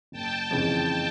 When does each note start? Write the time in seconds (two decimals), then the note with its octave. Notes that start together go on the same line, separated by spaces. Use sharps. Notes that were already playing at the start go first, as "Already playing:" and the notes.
0.12 F#1 G5 A5
0.51 F2 C#3 E3